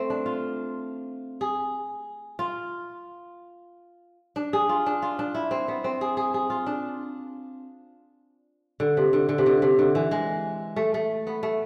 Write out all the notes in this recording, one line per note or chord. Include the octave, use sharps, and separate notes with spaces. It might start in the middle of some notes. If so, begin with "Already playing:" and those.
Already playing: A3 C4
D4
F4
G#4
F4
D4
G#4
F4
D4
F4
D4
E4
C4
B3
C4
G#4
G#4
G#4
F4
D4
D3
C3
D3
D3
C3
D3
C3
D3
E3
G#3
A3
A3
B3
A3